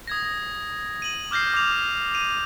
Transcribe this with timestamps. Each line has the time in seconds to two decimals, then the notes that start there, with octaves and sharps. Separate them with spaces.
0.07 D#6 G#6 A#6
1.02 D#7 F#7
1.31 D6 F6 G6 A#6 C7
1.54 D6 F7
2.14 D#7 F7